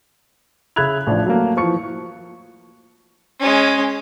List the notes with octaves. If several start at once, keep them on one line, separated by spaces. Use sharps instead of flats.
C#3 E5 B5 F#6 G#6 F7
A1 F3 D4
F#3 A3 A#3
E3 F3 C#6 C#7
G#3 C#4